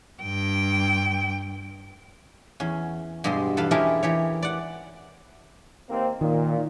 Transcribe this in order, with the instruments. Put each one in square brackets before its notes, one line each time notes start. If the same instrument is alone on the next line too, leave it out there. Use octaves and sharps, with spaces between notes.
[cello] G2 G5
[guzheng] E2 C#4
G2 B2 G#3 G4 C6
E2 A4 B4 F5 A5
G#3 C#4 E4 G4 A4 A#4
E3 G4 C#5
D5 F#5
[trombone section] D#2 A#3 C4
[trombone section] A#2 [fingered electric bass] D#3